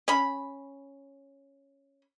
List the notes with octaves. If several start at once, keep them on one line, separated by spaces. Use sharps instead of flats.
C#4 B5